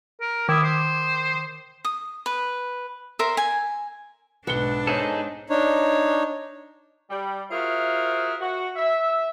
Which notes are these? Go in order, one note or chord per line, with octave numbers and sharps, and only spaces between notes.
A#4
D#3 E4 D6 D#6
C5
D#6
B4
A#4 C5 E5
G#5
B1 G#2 B3 D4 E5 C#7 G7
D#4 G#4 A4 C5 C#5
D4 D#4 C#5
G3
F4 F#4 G#4 A#4 C5 E5
F#4
E5